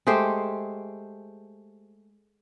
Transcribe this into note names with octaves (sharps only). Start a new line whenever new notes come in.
G#3 A3 G4 C5